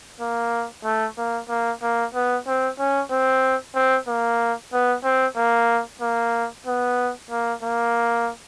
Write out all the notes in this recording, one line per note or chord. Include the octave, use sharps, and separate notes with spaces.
A#3
A3
A#3
A#3
A#3
B3
C4
C#4
C4
C4
A#3
B3
C4
A#3
A#3
B3
A#3
A#3